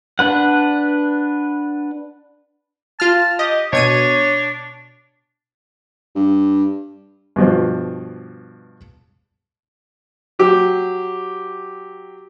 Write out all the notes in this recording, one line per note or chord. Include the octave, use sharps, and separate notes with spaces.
D4 B4 F#5
F4 A5 F6
G4 D#5
B2 D4 C#5 G#6 D#7
G2
G2 B2 F3
F#3 G4